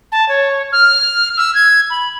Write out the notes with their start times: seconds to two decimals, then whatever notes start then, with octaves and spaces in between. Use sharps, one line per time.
0.12 A5
0.29 C#5
0.73 F6
1.37 E6
1.55 G#6
1.90 B5